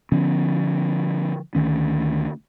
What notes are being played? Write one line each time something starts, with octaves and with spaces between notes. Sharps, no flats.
D3 F3 B3 C#4
D2 D#3 C#4